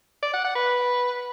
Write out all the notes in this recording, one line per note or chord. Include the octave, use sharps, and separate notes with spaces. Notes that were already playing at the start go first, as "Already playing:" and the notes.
D5
F#5
F#5
B4